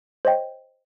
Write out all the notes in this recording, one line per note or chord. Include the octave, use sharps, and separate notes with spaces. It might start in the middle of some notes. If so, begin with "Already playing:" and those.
C5 C#5 D#5 G5